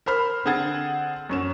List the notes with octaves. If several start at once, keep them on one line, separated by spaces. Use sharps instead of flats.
A#4 C5 B5 F6
D3 C4 G#4 F#5 G#6 A6
F#2 C#4 E7